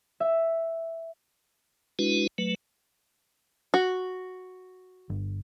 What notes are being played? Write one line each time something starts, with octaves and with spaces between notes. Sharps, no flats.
E5
G#3 D4 E4 F#4 B4
F#3 A3 B4
F#4
G1